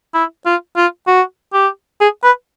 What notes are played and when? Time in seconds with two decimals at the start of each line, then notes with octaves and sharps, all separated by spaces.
0.14 E4
0.46 F4
0.77 F4
1.07 F#4
1.53 G4
2.01 G#4
2.24 B4